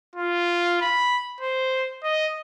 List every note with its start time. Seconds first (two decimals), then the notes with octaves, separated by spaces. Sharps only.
0.16 F4
0.82 B5
1.41 C5
2.04 D#5